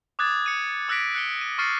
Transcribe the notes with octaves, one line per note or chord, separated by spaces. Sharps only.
D6 D#6 F#6 G#6 A6
C#7 D#7
D6 E6 F#6 A#6 B6 D7
F#6 C#7 G7
D#7
C#6 F6 A6 C7 C#7 D#7